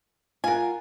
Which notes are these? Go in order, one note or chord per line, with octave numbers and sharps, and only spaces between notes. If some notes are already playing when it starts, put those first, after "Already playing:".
F4 A#4 F#5 G#5